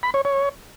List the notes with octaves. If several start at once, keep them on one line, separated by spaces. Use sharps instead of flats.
B5
C#5
C#5